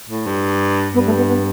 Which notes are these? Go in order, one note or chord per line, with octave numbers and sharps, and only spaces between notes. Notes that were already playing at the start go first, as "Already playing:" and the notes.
A2
G2
G2 B3
A3
B3
B3